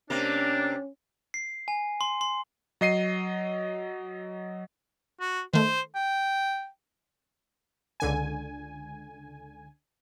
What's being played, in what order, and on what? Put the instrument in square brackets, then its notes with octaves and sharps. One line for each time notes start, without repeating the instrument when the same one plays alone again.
[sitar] C3 A#3 [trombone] C#4 [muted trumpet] D4
[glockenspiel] C7
G#5
C6
C6
[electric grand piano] F#3 D#5 C7 D#7
[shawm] F#4
[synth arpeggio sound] D#3 A3 [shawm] C5
[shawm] G5
[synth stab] C#2 D3 G#5